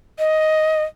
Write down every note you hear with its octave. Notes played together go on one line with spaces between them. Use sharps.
D#5